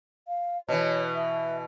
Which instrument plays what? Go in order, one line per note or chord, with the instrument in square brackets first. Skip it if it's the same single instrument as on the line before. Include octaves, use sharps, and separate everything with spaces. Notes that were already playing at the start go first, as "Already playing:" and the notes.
[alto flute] F5
[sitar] B2 E3 [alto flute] C#5
[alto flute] E5